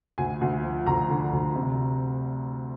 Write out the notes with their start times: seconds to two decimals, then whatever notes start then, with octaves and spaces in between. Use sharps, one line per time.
0.18 D2 G#5
0.41 D2
0.64 F3
0.86 D2 A#5
1.10 D3
1.32 D2
1.55 C3